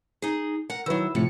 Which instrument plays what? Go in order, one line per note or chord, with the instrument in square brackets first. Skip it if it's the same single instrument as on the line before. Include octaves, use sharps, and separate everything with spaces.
[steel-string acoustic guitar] D#4 G#4
A#4 F#5
[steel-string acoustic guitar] D#3 F#3 [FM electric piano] E4 B4 E6
[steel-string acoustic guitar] A2 [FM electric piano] C3 F3 C#7